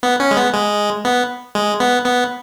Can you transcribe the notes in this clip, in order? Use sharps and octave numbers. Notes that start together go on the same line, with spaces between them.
B3
C#4
G#3
B3
G#3
B3
G#3
B3
B3